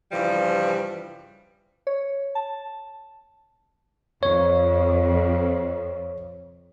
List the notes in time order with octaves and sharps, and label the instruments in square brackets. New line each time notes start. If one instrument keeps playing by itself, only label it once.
[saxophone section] G2 C#3 E3 F3 G3
[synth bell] C#5
A5
[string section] F2 [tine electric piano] C#5